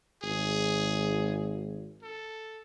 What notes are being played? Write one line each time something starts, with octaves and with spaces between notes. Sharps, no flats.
G#1 G#4
A4